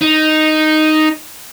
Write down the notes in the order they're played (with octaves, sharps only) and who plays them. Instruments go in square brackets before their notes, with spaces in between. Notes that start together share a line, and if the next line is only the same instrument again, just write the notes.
[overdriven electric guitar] D#4